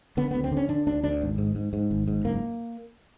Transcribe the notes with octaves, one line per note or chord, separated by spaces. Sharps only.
D3 B3
D2 B3
C4
D3
C#4
D3 D4
D2 D4
D2 D4
G#1
G#2
G#2
G#2
G#1
G#2
F#1 A#3